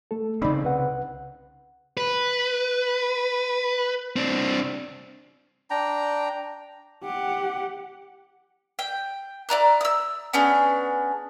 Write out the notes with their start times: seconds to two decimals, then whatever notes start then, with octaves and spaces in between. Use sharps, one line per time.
0.11 A3 A4
0.42 C#3 C4 D#4 D5 B5
0.64 C2 B4 F#5
1.97 B4
4.16 C4 D4
5.70 D4 G5 A#5
7.04 G4 F#5
8.79 G5
9.49 E4 D5 A#5 F#6
9.81 D#6 E6
10.33 B3 C#4 D4 G#4